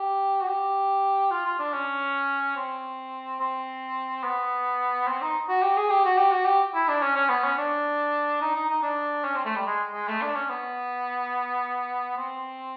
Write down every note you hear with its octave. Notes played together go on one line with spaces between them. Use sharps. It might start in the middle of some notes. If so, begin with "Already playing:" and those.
Already playing: G4
F#4
G4
F4
F4
D4
C#4
C4
C4
B3
C4
D#4
F#4
G4
G#4
G4
F#4
G4
F#4
G4
E4
D4
C#4
C#4
B3
C#4
D4
D#4
D#4
D#4
D4
C#4
C4
A3
G3
G#3
G#3
A3
D4
C#4
B3
C4